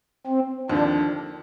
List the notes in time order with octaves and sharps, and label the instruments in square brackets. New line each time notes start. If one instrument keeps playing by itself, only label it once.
[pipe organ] C4
[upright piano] D#2 D3 F3 [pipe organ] D4